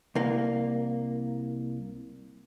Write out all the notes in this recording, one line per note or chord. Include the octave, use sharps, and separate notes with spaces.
C2 A#3